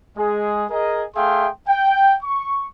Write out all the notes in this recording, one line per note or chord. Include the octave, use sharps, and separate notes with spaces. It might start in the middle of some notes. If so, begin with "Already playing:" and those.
G#3 G#4
G#4 A#4 D#5
A3 G#4 E5 F5 G5 C6
G5
C#6